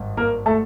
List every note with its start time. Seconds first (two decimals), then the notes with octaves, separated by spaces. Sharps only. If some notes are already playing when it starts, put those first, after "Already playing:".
Already playing: G#1 G2
0.17 A#3 A#4
0.46 A3 A4